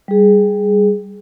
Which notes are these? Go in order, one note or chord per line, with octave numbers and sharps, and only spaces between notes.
G3 G#4